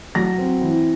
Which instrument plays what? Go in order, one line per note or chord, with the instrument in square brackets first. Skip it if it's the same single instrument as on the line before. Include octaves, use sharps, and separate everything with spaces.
[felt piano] F#3 A#6
C4
E3